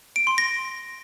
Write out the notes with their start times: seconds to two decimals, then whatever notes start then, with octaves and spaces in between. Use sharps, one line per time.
0.16 D7
0.27 C6
0.38 A#6